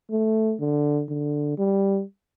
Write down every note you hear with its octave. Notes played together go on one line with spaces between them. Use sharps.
A3
D3
D3
G3